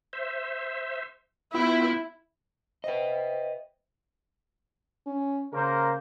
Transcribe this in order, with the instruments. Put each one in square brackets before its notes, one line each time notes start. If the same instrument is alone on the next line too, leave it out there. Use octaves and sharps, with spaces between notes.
[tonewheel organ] C5 E5
[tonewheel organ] B3 F4 G5 [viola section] E4
[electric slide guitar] B4 D#5 [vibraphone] C5 E5 G5
[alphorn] C#4
[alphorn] C#3 [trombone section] A#3 A#4 C5